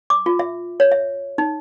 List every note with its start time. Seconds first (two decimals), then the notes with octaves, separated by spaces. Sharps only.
0.10 D6
0.26 F4
0.39 E5
0.80 C#5
0.92 E5
1.38 D#4